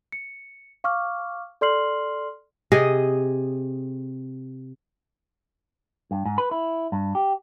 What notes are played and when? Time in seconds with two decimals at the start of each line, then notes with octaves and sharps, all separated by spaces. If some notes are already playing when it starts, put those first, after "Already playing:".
0.12 C#7
0.84 F5 C#6 D6 F6
1.61 A4 D5 C6 F6 C7 F#7
2.72 C3 G#4 D#5
6.11 G2
6.26 G#2
6.38 B4
6.51 E4
6.92 G2
7.15 G4